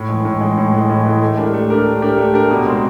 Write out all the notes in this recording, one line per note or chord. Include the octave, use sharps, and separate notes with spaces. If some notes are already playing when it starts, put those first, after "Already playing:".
Already playing: A2
E3 G#3
A2
E3 G#3
A2
E3 G#3
A2
E3 G#3
A3
D4 G4 A#4
A3
D4 G4 A#4
A3
D4 G4 A#4
A3
D4 G4 A#4
B2
G#3 C4